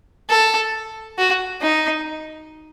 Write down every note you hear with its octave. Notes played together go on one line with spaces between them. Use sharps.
A4
F#4
D#4